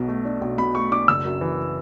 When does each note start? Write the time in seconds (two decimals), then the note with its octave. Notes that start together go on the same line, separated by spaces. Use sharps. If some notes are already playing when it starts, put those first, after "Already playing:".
Already playing: B1 B2
0.08 A3
0.25 D4
0.41 B1
0.58 B2 B5
0.75 A3 C#6
0.92 D4 D6
1.08 F#1 E6
1.25 F#2
1.41 E3